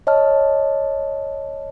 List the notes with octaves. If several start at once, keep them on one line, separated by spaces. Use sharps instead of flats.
C#5 D#5 A5 F6